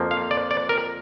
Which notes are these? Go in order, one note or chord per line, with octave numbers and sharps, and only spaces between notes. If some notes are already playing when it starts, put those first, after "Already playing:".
Already playing: F2 F3 A#3
F5
D5
D5
A#4